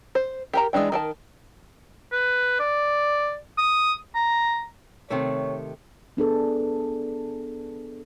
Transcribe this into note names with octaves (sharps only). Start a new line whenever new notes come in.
C5
G4 A#4 A#5
E3 G#3 A#3 D4 G5
D#3 A#4 A5
B4
D5
D#6
A#5
C3 D#3 A3 C#5
B3 D4 G#4 A4